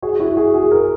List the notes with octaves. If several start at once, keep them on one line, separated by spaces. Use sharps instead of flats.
F#4 G#4
E4 F#4
F#4 G#4
F#4 G#4
G#4 A#4